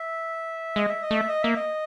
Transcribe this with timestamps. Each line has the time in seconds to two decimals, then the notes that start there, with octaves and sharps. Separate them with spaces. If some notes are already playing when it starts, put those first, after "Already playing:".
Already playing: E5
0.76 G#3 D#5
0.89 E5
1.02 D#5
1.11 A3 E5
1.29 D#5
1.42 A#3 E5
1.56 D#5